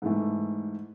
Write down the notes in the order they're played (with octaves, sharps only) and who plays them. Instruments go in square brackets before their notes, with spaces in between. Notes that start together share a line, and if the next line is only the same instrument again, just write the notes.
[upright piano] G#2 E3 A3